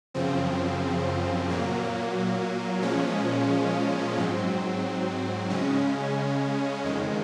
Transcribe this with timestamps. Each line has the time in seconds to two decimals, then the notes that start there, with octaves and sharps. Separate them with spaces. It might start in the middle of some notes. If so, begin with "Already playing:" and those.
0.14 F#2 C#3 F3 C4
1.49 A#2 F#3 A#3
2.82 A#2 F3 G#3 C#4
4.17 G#2 F#3 C4
5.50 C#3 G#3 C#4
6.84 F2 D#3 G#3